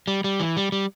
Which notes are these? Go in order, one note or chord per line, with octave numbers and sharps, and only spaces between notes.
G3
G3
E3
G3
G3